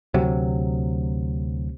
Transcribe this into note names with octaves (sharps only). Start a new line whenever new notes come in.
D2 C3 F#3